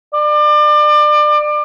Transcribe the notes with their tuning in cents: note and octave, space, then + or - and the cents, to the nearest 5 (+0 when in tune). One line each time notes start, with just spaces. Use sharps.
D5 +30